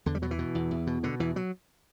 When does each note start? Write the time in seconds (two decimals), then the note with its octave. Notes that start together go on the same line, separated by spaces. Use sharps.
0.06 E2 D3
0.15 G3
0.22 B2 F#3
0.31 E3
0.39 B2
0.55 E2
0.71 E2
0.87 B2
1.03 B2 D3
1.20 E2 E3
1.36 F#3